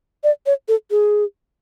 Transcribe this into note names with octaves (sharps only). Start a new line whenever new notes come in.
D5
C#5
A4
G#4